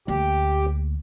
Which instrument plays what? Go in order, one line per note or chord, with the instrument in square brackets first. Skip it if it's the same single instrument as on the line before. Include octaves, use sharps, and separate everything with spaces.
[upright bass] D2 A#3 [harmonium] G4